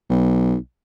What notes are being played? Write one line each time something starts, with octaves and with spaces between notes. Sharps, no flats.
B1